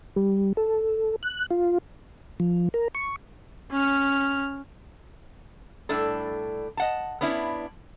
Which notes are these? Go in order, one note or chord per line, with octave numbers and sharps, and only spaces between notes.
G3
A4
F#6
F4
F3
A#4
C#6
C#4 F6
A2 G3 D4 A4
D#5 F#5 A5
B3 C#4 D4 E4